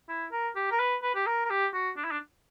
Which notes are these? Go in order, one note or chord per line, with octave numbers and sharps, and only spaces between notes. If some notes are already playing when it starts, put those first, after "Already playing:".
E4
A#4
G4
A#4
B4
B4
G4
A#4
A#4
G4
F#4
D4
E4
D4